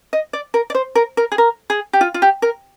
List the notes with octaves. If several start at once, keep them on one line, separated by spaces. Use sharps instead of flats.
D#5
D5
A#4
D5
C5
A#4
A#4
G#4
A#4
G#4
G4
F4
F4
G4
A#4